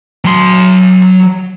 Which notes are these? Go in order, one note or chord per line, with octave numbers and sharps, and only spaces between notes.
F#3 C6